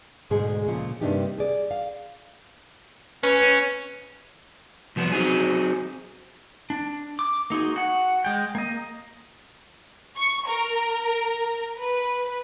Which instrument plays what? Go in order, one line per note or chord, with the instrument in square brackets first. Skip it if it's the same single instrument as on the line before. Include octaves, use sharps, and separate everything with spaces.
[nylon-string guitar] D2 G#2 B2 G#3 G#4
A#2 C#3 F3
G2 C3 A#3 D4 D#4 G4
G#4 D5
F5
[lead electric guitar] C#4 [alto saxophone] B4
[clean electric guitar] C2 F3 B3
F#3 C4 D#4 G#4
[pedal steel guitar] D4
D6
A#3 D#4 F#4 G#4
F#4 F#5
G#3 G5
A#3 D#5
[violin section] C#6
A#4
B4